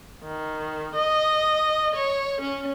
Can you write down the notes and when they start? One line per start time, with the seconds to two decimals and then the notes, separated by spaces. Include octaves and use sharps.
0.24 D#3
0.95 D#5
1.95 C#5
2.41 C#4